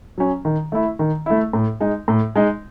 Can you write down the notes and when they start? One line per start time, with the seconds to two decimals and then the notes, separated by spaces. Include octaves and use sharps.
0.18 F#3 C#4
0.45 D#3
0.72 A3 E4
0.99 D#3
1.26 A3 E4
1.53 A2
1.80 G#3 D#4
2.08 A2
2.36 G#3 D#4